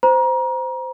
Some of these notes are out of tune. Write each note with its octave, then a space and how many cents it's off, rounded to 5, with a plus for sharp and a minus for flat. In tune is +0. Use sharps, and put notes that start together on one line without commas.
C5 -15 A#5 +30